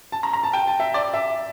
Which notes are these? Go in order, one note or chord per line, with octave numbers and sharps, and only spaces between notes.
A5
A#5
A#5
A5
G5
A5
E5
D5
E5